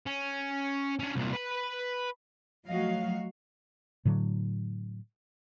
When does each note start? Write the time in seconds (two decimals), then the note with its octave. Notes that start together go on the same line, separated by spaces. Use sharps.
0.06 C#4
1.00 C#4 D4
1.15 C2 A#2
1.33 B4 B5
2.66 F3 F#3 A3 F#4 D#5 F5
4.05 A2 D3 F#3